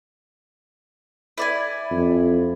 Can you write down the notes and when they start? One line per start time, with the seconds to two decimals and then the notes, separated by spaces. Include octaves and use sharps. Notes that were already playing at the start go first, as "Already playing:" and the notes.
1.38 E4 D5 G#5
1.91 F2